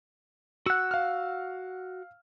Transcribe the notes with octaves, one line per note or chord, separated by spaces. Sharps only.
F#4 F#5 E6
F5 F6